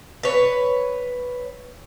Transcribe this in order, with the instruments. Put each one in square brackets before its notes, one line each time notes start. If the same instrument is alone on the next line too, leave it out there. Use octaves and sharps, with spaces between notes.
[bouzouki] B4 C#5